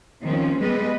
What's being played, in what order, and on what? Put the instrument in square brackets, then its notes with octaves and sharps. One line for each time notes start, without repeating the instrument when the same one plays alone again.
[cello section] D#3 F3 C4 C#4
G3 G#3 B3 B4 D#5